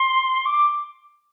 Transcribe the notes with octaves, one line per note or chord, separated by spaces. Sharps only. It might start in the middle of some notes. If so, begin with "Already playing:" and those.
Already playing: C6
D6